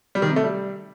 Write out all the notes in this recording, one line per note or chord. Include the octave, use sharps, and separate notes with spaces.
G3
D#3
C3
A3
G3